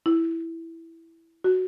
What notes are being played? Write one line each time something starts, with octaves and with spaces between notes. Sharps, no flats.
E4
F#4